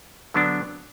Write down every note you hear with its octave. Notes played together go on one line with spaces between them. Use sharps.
D3 F#3 B3 D4